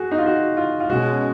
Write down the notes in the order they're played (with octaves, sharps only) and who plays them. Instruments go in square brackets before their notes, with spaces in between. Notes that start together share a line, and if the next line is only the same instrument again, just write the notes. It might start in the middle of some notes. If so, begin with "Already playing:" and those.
Already playing: [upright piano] F#4 G#4
D#4
F4
F#4
F4
F4
[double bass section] B2 G#3 C#4 [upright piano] F#4